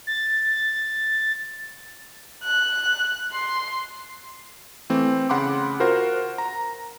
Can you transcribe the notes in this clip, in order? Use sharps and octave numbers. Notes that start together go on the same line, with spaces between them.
A6
F#6
C6
E3 A3 C4
C#3 F#5 B5 C6 D6
F4 F#4 A#4 C5 F#5
A#5